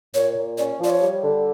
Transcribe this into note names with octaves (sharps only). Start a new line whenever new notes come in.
A#2 C#5
A#2
C#4 D5
F3 D5
C#5
G3
D3